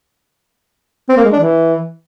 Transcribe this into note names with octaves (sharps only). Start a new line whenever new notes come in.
C4
A#3
G#3
D4
E3